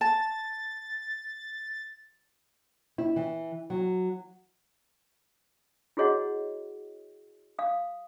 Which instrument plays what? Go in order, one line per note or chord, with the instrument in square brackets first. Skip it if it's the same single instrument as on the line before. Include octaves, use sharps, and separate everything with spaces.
[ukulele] A5 [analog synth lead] A6
[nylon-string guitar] E4
E3
F#3
[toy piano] E4 F#4 G#4 C#5 D#5 F#5
F5 D#6